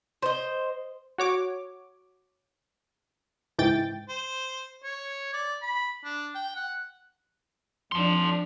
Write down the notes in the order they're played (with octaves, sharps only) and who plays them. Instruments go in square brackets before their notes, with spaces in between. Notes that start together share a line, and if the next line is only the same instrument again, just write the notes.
[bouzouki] C5 D#5
[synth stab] F#4 C#5 D6
C#2 G#2 E3 G5 A6
[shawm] C5
C#5
D5
B5
D4
G5
F#5
[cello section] F2 D4 [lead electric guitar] A5 C6